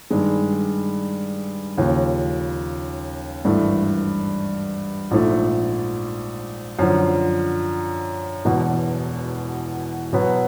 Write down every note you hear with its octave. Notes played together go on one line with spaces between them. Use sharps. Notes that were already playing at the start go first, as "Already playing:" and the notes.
G2 D#3 G#3
D#2 C#3 F3
G#1 G2 E3 A3
A#1 G#2 F3 A3
F#2 D3 F3
E1 E2 B2
B2 F#3 B3